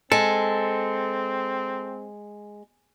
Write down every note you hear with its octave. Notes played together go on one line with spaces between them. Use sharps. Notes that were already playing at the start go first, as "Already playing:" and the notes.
G#3 C4 A4